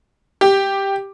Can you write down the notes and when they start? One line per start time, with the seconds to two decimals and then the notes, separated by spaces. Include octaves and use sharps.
0.41 G4